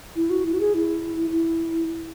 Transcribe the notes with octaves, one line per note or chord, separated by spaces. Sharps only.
E4
F#4
E4
F#4
G#4
E4
E4